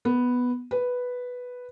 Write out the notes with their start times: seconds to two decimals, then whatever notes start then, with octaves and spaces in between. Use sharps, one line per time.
0.05 B3
0.71 B4